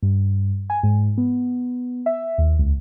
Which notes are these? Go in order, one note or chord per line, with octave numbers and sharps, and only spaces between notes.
G2
G#5
G#2
B3
E5
D#2
C#2